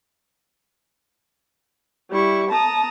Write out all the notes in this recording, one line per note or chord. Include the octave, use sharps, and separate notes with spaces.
G3 E4 C#6
A5 A#5 D#6